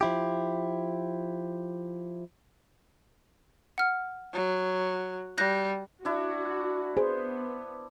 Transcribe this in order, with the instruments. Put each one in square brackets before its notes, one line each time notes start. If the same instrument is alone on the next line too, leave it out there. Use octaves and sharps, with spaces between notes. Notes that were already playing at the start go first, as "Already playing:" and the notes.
[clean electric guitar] F3 E4 G4
[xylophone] F#5 F6
[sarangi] F#3
[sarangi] G3 [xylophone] F#6 G6 A#6
[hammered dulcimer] D4 E4 [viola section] F#4
[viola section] B3 [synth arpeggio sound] G#4 [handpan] C5